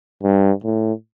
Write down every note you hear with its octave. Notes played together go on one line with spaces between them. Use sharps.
G2
A2